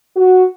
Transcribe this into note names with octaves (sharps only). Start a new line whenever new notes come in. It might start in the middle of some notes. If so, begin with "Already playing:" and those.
F#4